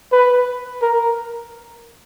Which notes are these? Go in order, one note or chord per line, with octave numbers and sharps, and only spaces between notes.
B4
A#4